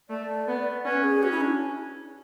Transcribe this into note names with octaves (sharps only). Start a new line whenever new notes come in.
A3 D5
B3
C#4 B4
G#4
C#4 F#4
E4
D4